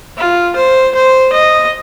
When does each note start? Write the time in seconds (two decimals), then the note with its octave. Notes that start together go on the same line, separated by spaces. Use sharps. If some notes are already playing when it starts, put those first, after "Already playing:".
0.18 F4
0.56 C5
0.95 C5
1.33 D#5